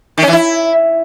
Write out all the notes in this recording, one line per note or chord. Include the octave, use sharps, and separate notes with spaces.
D#3
C#4
E3
E4